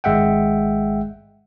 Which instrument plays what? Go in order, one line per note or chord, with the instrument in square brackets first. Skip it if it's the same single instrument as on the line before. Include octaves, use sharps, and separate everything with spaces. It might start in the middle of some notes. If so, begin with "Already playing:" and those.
[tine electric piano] G#1 G#3 E5 F#5 G5